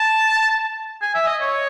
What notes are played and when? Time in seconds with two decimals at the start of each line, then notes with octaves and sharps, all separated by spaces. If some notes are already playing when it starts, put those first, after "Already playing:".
Already playing: A5
1.02 G#5
1.14 E5
1.27 D#5
1.41 C#5